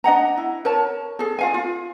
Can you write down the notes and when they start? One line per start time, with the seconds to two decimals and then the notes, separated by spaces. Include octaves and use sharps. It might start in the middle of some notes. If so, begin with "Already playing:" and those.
0.04 D4 D#5 F#5 A#5
0.37 E4
0.65 A#4 C#5 A5
1.19 G#4 A4
1.39 F4 F5 G#5
1.54 F4